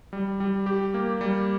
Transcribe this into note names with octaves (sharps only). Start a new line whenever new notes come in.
G3
G3
G4
A#3
G3